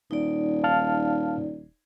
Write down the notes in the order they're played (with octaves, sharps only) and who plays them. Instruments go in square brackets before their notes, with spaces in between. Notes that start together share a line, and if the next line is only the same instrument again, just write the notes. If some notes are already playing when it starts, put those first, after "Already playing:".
[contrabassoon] D#1 [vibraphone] D#4 D5
[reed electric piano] F5 A5 F6